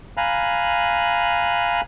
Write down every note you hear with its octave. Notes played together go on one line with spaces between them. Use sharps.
F5 G#5 A#5 B5 F#6